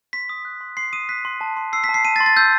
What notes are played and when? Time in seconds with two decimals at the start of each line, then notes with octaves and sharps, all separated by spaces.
0.13 C6 B6
0.29 D#6
0.45 F#6
0.61 C6
0.77 C6 C7
0.93 D#6 D#7
1.09 F#6 B6
1.25 C6
1.41 A5
1.57 C6
1.73 E6 C7
1.84 B6
1.89 A5
1.94 C7
2.05 A5 D#7
2.16 A6
2.20 C6
2.26 A6
2.37 E6 G6